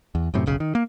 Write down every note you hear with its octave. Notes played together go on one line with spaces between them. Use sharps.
E2
F#2 A2 C3
F#1 B1 C#3
D#3
A#3